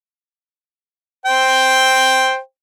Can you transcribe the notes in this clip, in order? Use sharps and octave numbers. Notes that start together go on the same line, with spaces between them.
C5 G5